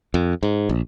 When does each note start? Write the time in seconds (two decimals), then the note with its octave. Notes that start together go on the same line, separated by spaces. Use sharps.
0.14 F2
0.43 G#2
0.69 A#1